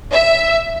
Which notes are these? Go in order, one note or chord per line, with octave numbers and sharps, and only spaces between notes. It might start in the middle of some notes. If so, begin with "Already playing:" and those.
E5